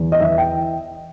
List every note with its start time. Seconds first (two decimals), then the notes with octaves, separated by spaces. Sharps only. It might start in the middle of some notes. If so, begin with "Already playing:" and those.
Already playing: E2
0.12 D#5
0.21 E3 E5
0.38 G5